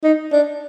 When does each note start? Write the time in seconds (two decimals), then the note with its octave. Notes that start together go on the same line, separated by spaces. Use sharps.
0.04 D#4
0.33 D4